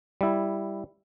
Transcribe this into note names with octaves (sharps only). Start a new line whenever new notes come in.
G3 E4